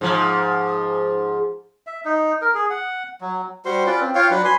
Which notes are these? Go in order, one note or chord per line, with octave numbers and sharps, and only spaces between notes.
G#2 F3
E5
D#4
A#4
G#4
F#5
F#3
G3 F#4 C5 C6
C#4 F4 B4 D5
C4
F4 C#5 F5 G5
F#3 D4 B4
G#5 B5 C6